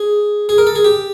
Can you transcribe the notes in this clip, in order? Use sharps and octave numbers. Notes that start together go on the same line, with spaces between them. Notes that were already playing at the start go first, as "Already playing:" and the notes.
Already playing: G#4
G#4
A#4
A4
G#4
G4